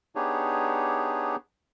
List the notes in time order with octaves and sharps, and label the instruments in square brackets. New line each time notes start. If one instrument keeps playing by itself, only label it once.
[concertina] B3 D4 D#4 G4 G#4 C#5